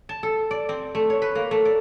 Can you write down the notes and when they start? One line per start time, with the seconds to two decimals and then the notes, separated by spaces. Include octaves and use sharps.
0.09 A5
0.23 A4
0.51 D5
0.69 C4
0.95 A3
1.10 C#5
1.22 B4
1.35 A#3
1.51 A3
1.65 D5